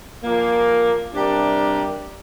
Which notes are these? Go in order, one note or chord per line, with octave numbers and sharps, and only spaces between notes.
A#2 F3 A#3
C3 G3 D4 G4 A#4